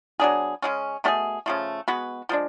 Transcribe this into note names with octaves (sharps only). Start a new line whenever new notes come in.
F#3 B3 D4 G#4
C#3 G#3 C#4
B2 A3 C#4 G#4
C#3 F3 A3
G#3 B3 F#4 B4
F3 G#3 D4